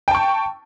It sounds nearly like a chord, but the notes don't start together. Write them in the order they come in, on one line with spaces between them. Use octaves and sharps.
G5 A5 C#6